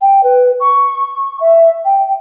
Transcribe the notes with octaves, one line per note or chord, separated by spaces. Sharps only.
G5
B4
C#6
E5
G5